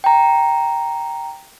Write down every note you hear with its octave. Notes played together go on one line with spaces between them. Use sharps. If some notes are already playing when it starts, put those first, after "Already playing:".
G5 A#5